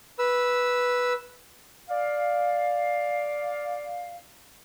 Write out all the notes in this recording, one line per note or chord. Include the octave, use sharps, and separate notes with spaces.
B4 E6
D5 F5